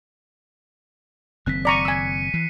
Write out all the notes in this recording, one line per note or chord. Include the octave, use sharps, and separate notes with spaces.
F#1 D#3 C4 F#6 B6
D5 A#5 C#6 B6 C#7 D#7
G#5 E6
E3 C7